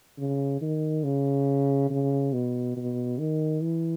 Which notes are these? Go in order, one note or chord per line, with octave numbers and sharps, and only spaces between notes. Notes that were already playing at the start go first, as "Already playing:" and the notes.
C#3
D#3
C#3
C#3
B2
B2
D#3
E3